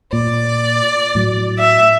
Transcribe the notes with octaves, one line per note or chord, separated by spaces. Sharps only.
A#2 D5
A2 F#3
E5